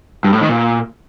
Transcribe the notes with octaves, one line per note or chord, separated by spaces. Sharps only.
G2
A2
D#3
A#2